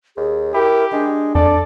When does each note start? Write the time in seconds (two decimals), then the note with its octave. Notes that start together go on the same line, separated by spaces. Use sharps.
0.17 D#2 G#4
0.54 E4 G4 A#4
0.93 G#3 D4
1.35 F2 A4 D5